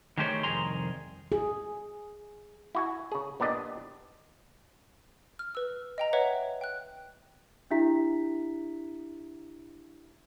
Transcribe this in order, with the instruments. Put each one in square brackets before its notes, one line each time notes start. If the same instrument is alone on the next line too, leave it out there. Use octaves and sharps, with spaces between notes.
[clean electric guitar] D#3 G#3 A3 G4 C5 C#5
C2 F2 D#3 G#4 A#5 C6
[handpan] G#4
[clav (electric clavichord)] E4 F#4 G#5
C#3 G#4
A#2 B3 D4 G4 D5 D#5
[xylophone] F6
B4 E6
D#5 G5 A#5
B4 C#5 D#5 E5 F#5
G5 F#6
[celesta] D4 E4 G4 E5 A#5 B6